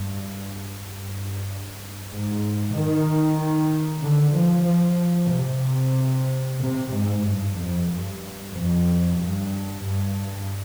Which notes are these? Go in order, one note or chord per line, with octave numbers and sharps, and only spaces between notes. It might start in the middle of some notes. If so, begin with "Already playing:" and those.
Already playing: G2
G2
G#2
D#3
D3
F3
F3
C3
C3
G#2
G2
F2
G2
F2
G2
G2